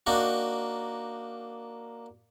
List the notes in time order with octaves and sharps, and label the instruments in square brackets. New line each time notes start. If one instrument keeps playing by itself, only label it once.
[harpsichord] A#3 D4 D#4 F#4